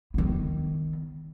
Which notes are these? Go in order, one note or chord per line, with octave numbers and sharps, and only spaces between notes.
D#3 B3